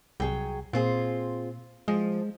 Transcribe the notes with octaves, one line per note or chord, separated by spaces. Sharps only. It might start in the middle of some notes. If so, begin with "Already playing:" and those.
C2 F#3 G#4 G5
A#2 C4 F4 G#4
F3 G#3